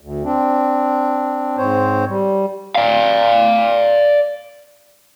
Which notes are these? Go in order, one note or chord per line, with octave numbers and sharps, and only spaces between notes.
D2
C4 D4
G#2 C4 C5 C#5
G3
D5 F5